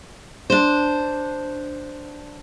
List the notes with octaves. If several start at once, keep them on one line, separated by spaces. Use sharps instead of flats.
D4 C5